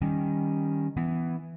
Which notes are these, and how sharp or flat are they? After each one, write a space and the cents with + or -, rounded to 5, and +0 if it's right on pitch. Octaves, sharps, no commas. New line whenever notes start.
D#3 +0 G3 +0 C#4 +0
E3 +5 B3 +15